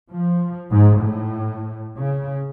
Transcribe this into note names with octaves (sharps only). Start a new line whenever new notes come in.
F3
G#2
A2
C#3